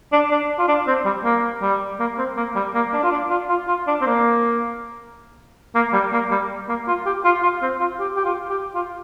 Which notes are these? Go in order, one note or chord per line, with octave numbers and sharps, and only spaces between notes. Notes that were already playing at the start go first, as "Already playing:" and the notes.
D4
D4
F4
D4
C4
G3
A#3
G3
A#3
C4
A#3
G3
A#3
D4
F4
D4
F4
F4
F4
D4
C4
A#3
A#3
G3
A#3
G3
A#3
F4
G4
F4
F4
C4
F4
G4
G4
F4
G4
F4